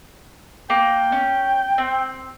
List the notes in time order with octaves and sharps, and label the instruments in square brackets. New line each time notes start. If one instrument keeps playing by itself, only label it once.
[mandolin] A#3 [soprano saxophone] G5
[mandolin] C#4
C4